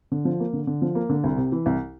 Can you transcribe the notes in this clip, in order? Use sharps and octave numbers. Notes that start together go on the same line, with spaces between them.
D3
F3
A#3
D3
D3
F3
A#3
D3
C2
C3
E3
C2